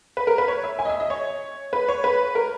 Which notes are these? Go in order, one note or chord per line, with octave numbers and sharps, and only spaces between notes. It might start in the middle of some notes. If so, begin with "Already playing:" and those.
B4
A#4
B4
C#5
E5
G#5
D#5
E5
D#5
C#5
B4
C#5
B4
A#4